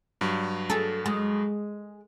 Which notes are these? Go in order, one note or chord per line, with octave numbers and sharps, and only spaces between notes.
G2 F#3
G#4 A4
G#3